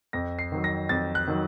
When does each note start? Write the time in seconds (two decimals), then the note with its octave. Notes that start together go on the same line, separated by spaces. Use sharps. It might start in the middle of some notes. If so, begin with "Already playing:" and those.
0.13 F2 A#6
0.39 C7
0.52 D#3 F#3
0.64 A#6
0.89 F2 A6
1.15 F#6
1.27 D#3 F#3